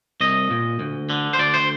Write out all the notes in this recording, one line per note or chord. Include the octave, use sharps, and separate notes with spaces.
C2 D#5
A#2
D2
D3
C5
D2 D5
C5